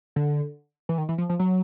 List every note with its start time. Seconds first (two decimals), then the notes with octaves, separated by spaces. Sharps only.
0.16 D3
0.89 E3
0.98 D#3
1.09 E3
1.18 F3
1.29 F3
1.39 F#3